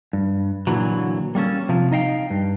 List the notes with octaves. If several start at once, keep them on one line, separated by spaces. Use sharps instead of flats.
G2
A#2 D3 E3 F#3
G3 A#3 C#4 A4
C3 F3
D#4 D#5 F5 G5
G2